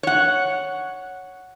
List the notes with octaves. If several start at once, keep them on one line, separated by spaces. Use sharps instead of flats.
C#5 F#5